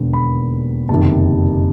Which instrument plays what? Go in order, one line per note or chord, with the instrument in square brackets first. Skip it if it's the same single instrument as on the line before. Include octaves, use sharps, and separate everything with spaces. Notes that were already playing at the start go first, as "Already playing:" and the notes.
Already playing: [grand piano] E1 D#2 D3
B5
F#1 F2 C3 D#3 A5